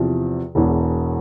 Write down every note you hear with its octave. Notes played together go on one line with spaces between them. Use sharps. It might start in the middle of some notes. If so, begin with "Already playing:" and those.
Already playing: E2 C3 F3
E1 E2 E3